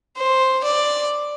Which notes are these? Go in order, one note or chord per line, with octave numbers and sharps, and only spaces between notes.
C5
D5